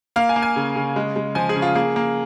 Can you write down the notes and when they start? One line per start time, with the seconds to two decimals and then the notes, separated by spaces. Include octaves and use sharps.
0.16 A#3 F5
0.29 G#5
0.36 A#3
0.42 G#5
0.56 C#3
0.76 C#3
0.96 G#3
1.16 G#3
1.35 F3 G#5
1.49 G#4
1.56 C#3
1.62 F4
1.75 A#3 G#4
1.96 A#3